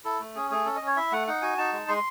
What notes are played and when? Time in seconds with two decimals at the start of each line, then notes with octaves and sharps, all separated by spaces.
0.05 E4 A4
0.20 A3
0.35 C#4 G#4
0.51 A3 G#4
0.66 C#4 A4
0.76 D#5
0.82 C#4
0.87 C#5
0.96 E4 E5
1.12 A3 F#5
1.27 D#4 F#5
1.42 F#4 G#5
1.58 D#4 A5
1.73 G#3
1.88 G#3 C6